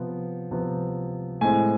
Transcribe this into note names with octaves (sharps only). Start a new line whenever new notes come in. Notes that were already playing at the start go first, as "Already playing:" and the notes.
Already playing: C3 F3 B3
C3 F3 B3
A2 G#3 C4 G#5